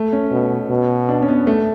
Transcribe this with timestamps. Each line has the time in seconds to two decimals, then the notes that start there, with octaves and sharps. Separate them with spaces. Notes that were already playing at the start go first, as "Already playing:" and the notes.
Already playing: A3
0.13 C#4
0.31 B2
0.70 B2
1.09 D4
1.22 C#4
1.28 B3
1.47 A3